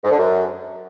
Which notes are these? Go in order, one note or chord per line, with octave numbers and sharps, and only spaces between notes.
G#2
D3
F#2